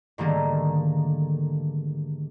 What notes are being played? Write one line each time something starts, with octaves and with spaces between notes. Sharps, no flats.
G#2 D3 D#3 G3 A3 A#3